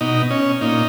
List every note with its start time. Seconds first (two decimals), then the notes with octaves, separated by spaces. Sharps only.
0.01 B2 D#4
0.30 C#4
0.61 A#2 D#4